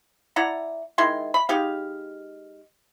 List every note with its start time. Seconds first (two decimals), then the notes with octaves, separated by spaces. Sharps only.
0.36 E4 D5 F#5 A#5
0.98 D#3 G#3 E4 C6
1.34 B5
1.49 G#3 D#4 G4 F5